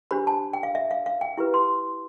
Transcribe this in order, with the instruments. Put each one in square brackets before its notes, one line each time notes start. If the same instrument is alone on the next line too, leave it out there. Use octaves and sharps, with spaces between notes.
[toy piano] D4 G4 C5 B5
A5
G5
F5
E5
F5
F5
G5
E4 G4 B4
C6